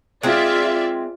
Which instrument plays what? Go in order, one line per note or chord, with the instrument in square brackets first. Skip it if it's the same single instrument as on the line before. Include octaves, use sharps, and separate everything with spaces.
[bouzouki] G#3 C4 [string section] F4 D5 E5